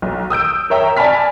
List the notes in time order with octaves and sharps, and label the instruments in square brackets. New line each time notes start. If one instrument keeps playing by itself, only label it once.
[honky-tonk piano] B1
D#6 E6 G6 D7
A#4 C#5 E5 G5 A#5
D5 G#5 A5 B5 F6 B6